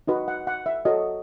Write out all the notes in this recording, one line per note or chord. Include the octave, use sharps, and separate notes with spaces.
D#4 F#4 B4 D#5
F#5
F#5
E5
F#4 A4 C#5 D#5